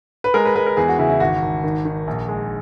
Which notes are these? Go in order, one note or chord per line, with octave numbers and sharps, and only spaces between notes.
B4
G#3 A#4
B4
G#3 B4
A#4
E2 G#4
F#4
C#3 E4
E4
G#1 F#4
G#1
D#3
D#3
A#1
G#3